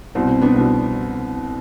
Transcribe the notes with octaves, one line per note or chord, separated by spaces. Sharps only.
C2 B2 C4
C4
B3 D4
C2 B2